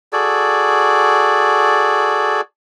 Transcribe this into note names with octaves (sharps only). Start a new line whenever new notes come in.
F#4 G#4 A4 D5